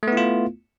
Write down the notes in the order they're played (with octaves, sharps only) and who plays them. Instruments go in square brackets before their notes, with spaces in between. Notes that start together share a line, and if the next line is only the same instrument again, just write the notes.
[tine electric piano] A3
B3
E4
F4